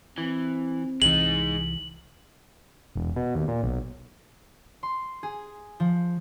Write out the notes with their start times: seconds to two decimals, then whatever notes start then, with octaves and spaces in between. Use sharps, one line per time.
0.18 E3 C4
1.02 C2 E3 G#3 D#4 F#7
2.95 E1
3.16 B2
3.35 D#2
3.48 A#2
3.63 B1
4.83 C6
5.23 G#4
5.80 F3